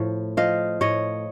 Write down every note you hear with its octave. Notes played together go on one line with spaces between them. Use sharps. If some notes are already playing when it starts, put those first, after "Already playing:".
Already playing: A2 F3
F3 D#5 F5
A2 C#5 D#5